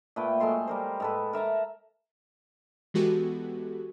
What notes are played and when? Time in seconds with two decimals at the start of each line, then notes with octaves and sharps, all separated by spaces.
0.16 A#2 A3 B4 G5
0.40 F#3 G#3 A4 C6
0.67 G3 A#4 C5
1.00 G#2 A4 B4
1.33 A#4 E5 A5 A#5
2.94 E3 G#3 B3 F#4 G4 A4